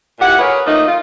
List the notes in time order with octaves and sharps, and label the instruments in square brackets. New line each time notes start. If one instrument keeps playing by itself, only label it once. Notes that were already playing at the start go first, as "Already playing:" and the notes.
[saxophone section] A#2 E4 G4 F#5
G#4 A#4 B4 C#5
F3 A3 A#3 D#4
F4